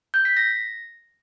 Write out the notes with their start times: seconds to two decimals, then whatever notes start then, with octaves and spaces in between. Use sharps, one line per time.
0.14 G6
0.25 B6
0.37 A#6